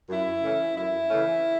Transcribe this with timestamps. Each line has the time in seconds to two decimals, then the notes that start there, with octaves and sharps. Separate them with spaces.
0.09 F#2 E4
0.42 C#3 E3 A3 C#4
0.76 F#2 E4
1.10 C#3 E3 A3 C#4